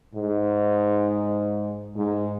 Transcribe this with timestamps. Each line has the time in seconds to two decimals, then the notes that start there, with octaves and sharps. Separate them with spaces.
0.14 G#2
1.96 G#2